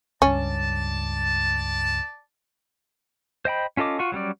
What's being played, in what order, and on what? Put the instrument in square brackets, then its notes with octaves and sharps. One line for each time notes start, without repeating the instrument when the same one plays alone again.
[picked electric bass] C#2 G2 [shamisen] C#4 [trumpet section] D5 A5
[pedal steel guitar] C5 D#5 G5 B5
C#4 F4 A4 D#5 D6
F4 F#4 C#6
F#3 G3 C#4 D5